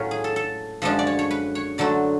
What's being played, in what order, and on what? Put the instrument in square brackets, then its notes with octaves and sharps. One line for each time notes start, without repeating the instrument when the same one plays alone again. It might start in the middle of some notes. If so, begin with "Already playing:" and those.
Already playing: [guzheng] A2 F#3 C#4 F4 C#5
G#4
A4
A4
F#2 D3 F3 G#3 D4 A4
D5
C#5
C#5
B4
C#5
D3 F#3 A3 D5